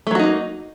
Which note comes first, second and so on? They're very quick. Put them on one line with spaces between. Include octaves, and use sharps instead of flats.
A3 F#3 F#4 D#4 A#3